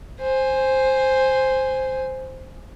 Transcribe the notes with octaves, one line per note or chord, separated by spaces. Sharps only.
C5 G#5